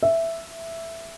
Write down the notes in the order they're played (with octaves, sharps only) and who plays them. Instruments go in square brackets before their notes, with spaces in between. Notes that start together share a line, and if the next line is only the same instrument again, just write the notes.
[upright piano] E5